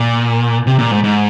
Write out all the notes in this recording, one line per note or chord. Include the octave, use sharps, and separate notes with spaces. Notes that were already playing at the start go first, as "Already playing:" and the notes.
Already playing: A#2
C3
A#2
G#2
G#2